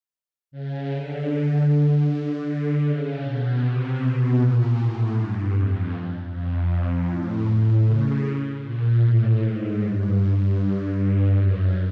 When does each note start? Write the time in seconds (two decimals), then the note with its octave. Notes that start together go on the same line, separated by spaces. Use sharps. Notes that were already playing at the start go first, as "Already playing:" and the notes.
0.52 C#3
0.90 D3
1.68 D3
2.06 D3
2.45 D3
2.83 C#3
3.22 B2
3.61 C3
3.99 B2
4.38 A#2
4.76 A2
5.15 G2
5.53 F2
6.31 F2
7.09 A2
7.85 C#3
8.62 A#2
9.01 A2
9.40 G#2
9.78 G2
10.94 G2
11.33 F#2